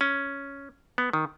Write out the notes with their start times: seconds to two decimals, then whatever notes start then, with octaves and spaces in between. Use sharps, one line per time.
0.01 C#4
0.98 B3
1.13 D#3